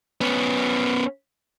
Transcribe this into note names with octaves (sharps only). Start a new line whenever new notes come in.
B3 C#4